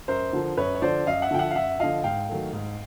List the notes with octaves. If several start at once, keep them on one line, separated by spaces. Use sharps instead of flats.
F#2 A#4 C5
D3 F3
F#2 B4 C#5
C#5
D3 F3 C5 D5
F#2 D#5 F5
E5 F#5
D3 F3 G5
E5 F#5
F5
F#2 E5 F#5
D3 F3 D#5 F5
G#2 F5 G5
D#3 F#3 A3
G#2